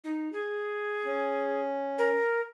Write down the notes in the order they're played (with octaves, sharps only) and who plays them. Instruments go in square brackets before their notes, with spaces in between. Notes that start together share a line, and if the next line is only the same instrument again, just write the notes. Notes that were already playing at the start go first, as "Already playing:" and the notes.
[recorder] D#4
G#4
[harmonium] C#4
[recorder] A#4